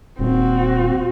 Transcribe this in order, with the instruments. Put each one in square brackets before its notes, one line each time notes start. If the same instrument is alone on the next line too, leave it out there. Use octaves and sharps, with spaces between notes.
[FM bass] D#1 [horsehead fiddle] C4 F#4